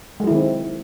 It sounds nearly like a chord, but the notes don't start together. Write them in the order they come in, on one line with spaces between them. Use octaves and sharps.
G#3 F#3 E4 D#3 C4